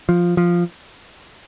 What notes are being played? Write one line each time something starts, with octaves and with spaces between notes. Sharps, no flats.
F3
F3